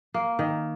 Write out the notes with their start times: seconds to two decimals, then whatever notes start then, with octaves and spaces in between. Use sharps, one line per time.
0.14 A#3
0.39 D#3